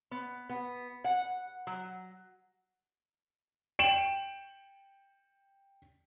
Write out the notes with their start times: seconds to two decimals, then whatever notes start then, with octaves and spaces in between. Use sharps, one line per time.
0.11 B3
0.49 B3
1.04 F#5
1.67 F#3
3.79 G5 D7 E7 F#7